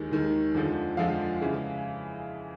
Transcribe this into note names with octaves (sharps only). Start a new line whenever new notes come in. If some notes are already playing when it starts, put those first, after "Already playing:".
Already playing: D#2 D#3 G#3
D#2 D#3 G#3
F2 D3 F3 G#3
F2 D3 F3 G#3 F5
C#3 E3 G#3